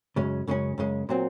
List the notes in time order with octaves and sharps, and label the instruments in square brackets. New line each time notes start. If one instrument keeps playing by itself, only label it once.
[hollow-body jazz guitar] F#2 C#3 G#3 C#4
F#2 C#3 G#3 C#4
F#2 C#3 G#3 C#4
A#2 F#3 C4